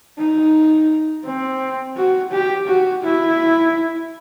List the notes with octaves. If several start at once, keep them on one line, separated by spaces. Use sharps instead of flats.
D#4
C4
F#4
G4
F#4
E4